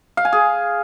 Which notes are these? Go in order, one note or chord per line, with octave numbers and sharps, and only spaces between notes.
F5
G#5
G#4